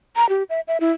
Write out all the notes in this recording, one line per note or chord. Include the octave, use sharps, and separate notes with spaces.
A#5
G4
E5
E5
E4